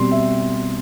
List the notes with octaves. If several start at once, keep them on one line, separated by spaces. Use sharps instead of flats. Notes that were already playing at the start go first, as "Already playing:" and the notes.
Already playing: B2 G3 C4 C6
E5